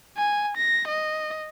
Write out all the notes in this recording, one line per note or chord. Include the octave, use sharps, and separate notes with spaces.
G#5
A#6
D#5